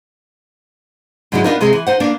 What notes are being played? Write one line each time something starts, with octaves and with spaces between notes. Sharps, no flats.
G#2 D3 F#3 G#3 D#4 E4
B3 D4 D#4 F4 A#4
C3 G#3 C4 G#4
E3
D#4 C5 F#5
A#3 B3 D4